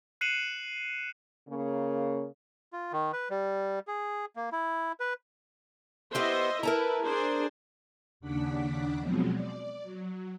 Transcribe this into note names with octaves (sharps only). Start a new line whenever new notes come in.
F#6 C7 C#7 D#7 E7 F#7
C#3 A#3
F4
D#3
B4
G3
G#4
A#3
E4
B4
B3 G4 B4 C5 D#5 E5
E4 A#4 B4 A5 A#5
D4 G#4 C5
D#2 C#3 D4 F#5 D6 B6
B2 F3 F#3 G#3 B3 C4
D5
F#3